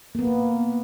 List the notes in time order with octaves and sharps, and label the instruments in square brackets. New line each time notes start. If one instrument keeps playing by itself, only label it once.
[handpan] A#3 B3